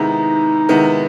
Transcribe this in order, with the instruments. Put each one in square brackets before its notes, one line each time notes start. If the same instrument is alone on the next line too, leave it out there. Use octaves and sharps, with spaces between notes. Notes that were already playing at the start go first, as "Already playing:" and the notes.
Already playing: [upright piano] C3 D#3 G#3 B3 E4 [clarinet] D#4
[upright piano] C3 D#3 G#3 B3 E4